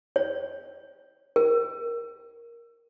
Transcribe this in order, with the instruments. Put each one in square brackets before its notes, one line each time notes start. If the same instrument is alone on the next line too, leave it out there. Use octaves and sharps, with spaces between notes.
[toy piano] C#5
A#4